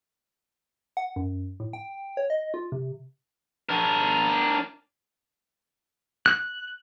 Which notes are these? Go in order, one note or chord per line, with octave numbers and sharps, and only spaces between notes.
F#5
F#2
A2
G5
C#5
D#5
F4
C3
D4 A#4
F#6